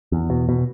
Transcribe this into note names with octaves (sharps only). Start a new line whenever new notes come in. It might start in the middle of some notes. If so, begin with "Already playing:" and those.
E2
B2
B2